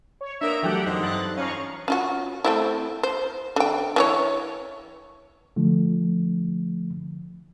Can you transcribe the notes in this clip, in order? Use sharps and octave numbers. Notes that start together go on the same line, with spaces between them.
C#5
A#3 B3 D4 A#4 E5 A#5 D7
E3 F#3 A3 G4 F#5 G5
F2 D3 C4 D#4
G2 F#6 A6
F2 C#4 F5 A#5 C#6
C#4 F4 F#4
A3 C4 E4
C5
D3 G5
E3 G#4 C#5
D3 F3 A3